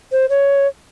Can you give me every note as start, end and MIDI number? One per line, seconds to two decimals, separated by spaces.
0.12 0.26 72
0.29 0.67 73